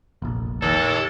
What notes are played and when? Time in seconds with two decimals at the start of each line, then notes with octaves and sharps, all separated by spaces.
0.22 F1 A#1
0.62 D#2 A4